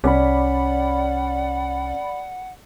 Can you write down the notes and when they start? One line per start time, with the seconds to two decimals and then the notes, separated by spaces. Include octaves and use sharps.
0.04 C2 C#4 D5 F#5 B5